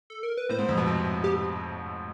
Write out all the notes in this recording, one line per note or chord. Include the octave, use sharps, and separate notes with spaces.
A4
A#4
B4
A2 C5
G#2
F2
B2
C3
G4